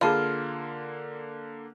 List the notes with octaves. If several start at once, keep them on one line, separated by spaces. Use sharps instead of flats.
D3 A#3 F4 G#4 A5 B5